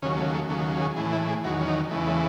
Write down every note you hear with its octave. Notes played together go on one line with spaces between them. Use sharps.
D#2 C#3 F#3 C#4
A3
A3
D#2 C#3 F#3 A3
G#4
A2 E3 G#4
E4
G#4
E2 D#3 F#3 F#4
C#4
D#4
E2 C#3 E3 A3
A3